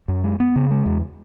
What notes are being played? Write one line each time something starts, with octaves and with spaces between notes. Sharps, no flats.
F#2
G#3
B3
C#3
G#3
E2